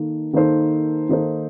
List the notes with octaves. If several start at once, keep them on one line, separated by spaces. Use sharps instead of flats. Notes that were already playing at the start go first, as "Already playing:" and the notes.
Already playing: D#3 A#3 D#4 A4
D#3 A#3 D#4 A4 C5
D#3 A#3 D#4 A4 C5